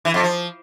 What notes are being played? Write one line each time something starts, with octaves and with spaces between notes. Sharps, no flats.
E3
F2
F3